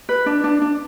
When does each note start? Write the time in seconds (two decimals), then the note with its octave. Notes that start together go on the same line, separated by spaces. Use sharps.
0.09 B4
0.26 D4
0.44 D4
0.61 D4